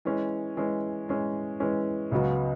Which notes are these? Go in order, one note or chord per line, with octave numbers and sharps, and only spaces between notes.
E3 G#3 C#4
E3 G#3 C#4
E3 G#3 C#4
E3 G#3 C#4
C#2 C#3 F#3 B3 F#4